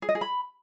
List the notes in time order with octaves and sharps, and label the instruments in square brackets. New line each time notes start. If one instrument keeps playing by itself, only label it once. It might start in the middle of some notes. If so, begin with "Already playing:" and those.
[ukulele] G#4
D#5
G#4
B5